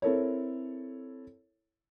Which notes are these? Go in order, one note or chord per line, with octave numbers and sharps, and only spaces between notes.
C4 E4 A4 A#4 C#5